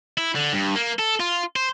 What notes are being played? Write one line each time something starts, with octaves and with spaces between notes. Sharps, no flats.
E4
D3
G2
A#3
A4
F4
C5